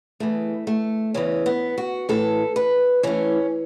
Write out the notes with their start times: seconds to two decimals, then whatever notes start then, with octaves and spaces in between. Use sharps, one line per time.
0.20 E2 C#3 E3 A3
0.67 A3
1.14 E2 C#3 E3 C#4
1.46 B3
1.78 F#4
2.09 A2 E3 A4
2.56 B4
3.03 A2 E3 C#4